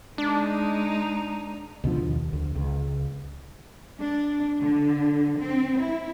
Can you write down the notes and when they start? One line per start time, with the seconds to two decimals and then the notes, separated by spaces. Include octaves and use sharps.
0.18 G#3 D4 D#4
1.84 C#2 B2 D3 F3
2.02 D#2
2.33 D2
2.55 C#2
3.98 D4
4.61 D3
5.39 C4
5.82 E4